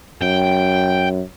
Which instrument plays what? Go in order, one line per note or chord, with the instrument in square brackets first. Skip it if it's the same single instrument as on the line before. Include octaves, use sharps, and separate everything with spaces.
[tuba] F#2 [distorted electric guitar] G5